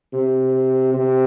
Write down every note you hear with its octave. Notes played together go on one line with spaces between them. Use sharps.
C3
C3